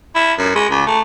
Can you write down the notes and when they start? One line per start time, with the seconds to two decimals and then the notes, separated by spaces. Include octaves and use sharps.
0.15 E4
0.39 F#2
0.56 G#3
0.70 C#2
0.86 A3